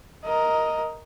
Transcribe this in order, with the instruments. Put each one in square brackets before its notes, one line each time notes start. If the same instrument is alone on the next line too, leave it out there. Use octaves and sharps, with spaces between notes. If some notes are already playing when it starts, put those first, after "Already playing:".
[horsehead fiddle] A#4 D#5